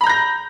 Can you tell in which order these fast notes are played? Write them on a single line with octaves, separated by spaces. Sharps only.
B5 A#5 G6 A#6